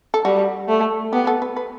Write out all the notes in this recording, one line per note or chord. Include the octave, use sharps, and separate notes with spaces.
A4
G3 F#4
A3
B3 G4
A4
B4
B4